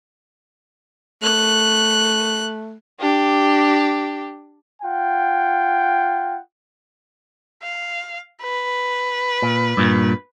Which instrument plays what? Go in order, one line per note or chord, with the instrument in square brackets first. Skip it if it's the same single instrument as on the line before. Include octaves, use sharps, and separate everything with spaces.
[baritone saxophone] A3 [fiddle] F#6
[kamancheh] D4 G4
[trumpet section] F4 F#5 G5
[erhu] F5
B4
[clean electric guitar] A#2
G2 A#2